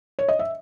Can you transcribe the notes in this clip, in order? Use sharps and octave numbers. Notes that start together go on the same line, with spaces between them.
C#5
D#5
E5